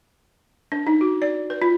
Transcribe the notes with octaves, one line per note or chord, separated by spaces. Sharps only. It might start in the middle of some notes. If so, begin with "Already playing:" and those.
D4
D#4
F#4
D5
B4
F4